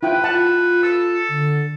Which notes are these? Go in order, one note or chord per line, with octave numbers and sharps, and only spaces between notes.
E4 F4 B4 G5
F4 F#5 A5
A4 E6
D3